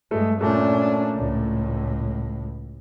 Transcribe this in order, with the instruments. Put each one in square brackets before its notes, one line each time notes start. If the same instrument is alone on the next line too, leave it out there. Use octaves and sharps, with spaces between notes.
[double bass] G2 G#3 [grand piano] A3
[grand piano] A#2 A3 [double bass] C#4 D4
[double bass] C#2 A2